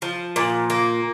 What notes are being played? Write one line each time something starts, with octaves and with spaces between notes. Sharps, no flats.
F3
A#2
A#3